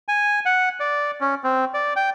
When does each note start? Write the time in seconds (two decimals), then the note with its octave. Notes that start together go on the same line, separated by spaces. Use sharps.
0.08 G#5
0.46 F#5
0.80 D5
1.21 C#4
1.44 C4
1.74 D5
1.96 G5